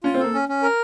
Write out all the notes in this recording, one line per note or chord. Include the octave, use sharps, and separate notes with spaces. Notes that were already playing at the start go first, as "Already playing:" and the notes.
C#4 F4
C4
A#3 A4
C#4
C#4
A#4